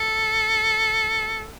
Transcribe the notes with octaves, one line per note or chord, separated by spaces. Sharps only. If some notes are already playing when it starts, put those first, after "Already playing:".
Already playing: A4